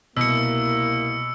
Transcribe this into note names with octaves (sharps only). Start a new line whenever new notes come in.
C2 B2 A#3 E4 E6 C#7